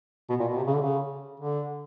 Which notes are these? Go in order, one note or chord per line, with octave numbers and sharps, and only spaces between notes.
B2
A#2
B2
C3
C#3
D3
C#3
D3